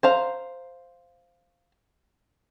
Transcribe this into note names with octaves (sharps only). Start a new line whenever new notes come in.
C5 F5 A#5